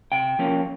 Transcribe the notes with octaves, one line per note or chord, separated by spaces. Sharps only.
C3 G5
F3 A#3 C#4